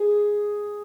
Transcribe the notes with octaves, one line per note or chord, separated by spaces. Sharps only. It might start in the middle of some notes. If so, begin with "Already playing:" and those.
Already playing: G#4